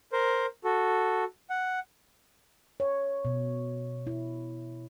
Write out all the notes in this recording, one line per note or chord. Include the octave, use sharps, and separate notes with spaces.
A#4 C5
F#4 A4
F#5
C#5
B2
E4